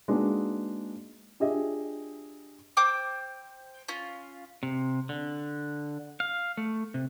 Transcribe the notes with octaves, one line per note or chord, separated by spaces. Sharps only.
G#3 A#3 B3 D4 D#4 F#4
D4 F4 G4 G#4 D#5 E5
C5 G5 D6 E6
C#4 F4
C3
D3
F5
A3
C3